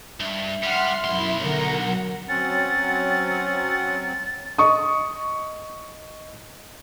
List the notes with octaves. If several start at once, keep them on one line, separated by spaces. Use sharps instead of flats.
G2 E5
G3 F#5 C6 F6
B1 F#2 E4 C6
D3 A#4 F#5 A#5
F#3
F#3 C4 C#4 F#5 A6
D#5 C#6 D#6